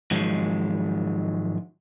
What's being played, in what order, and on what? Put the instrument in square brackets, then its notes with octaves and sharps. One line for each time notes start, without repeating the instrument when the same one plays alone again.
[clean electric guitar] G#2 D#3 F3 F#3 G#3